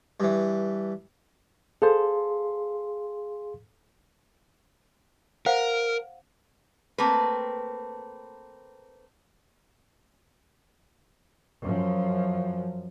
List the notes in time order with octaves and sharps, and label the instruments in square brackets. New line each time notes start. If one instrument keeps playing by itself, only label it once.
[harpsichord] G2 E3
[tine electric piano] G#4 F5 C6 [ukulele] A4 C5
[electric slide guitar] A#4 [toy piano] C5 F5 F#5
[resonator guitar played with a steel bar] A3 A#3 C4 B4
[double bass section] F#2 F3